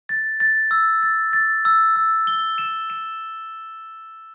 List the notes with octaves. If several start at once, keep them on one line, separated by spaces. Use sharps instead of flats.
A6
A6
E6
A6
A6
E6
E6
G7
E7
E7